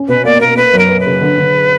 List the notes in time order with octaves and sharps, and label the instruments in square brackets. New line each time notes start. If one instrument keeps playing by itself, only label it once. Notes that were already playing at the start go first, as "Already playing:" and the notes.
Already playing: [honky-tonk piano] C#4
[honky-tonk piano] B2 [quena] B4
[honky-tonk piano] A#3 [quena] D5
[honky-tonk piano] A#3 [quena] A#4
[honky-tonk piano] B3 [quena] B4
[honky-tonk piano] F#2 [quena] A#4
[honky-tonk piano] B3
[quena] B4
[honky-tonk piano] C#3
D3
D3